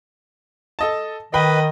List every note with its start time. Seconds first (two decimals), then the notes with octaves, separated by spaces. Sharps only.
0.79 A4 D#5 A5
1.34 D#3 B4 D#5 G5 B5